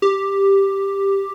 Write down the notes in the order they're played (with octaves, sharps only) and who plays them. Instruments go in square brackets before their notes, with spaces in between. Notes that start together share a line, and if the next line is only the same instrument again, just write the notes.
[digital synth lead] G4